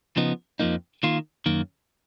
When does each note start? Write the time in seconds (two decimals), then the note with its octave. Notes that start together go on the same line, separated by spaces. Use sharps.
0.16 C#3 F3 B3 D#4
0.59 F2 F3 A#3 D#4
1.03 D#3 A#3 F4
1.46 F#2 D#3 A#3